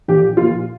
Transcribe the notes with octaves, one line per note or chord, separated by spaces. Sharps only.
A#1 G4
A#2 F3 F4